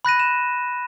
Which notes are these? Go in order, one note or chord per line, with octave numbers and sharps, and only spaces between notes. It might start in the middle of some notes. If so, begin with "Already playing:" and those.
B5 F#6 A#6 D#7
E7